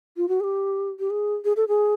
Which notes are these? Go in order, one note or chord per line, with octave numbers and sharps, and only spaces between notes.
F4
F#4
G#4
G4
G4
G#4
G#4
A4
G#4